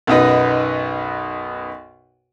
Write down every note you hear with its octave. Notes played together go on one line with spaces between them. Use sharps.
B1 F#2 B2 D#4 B4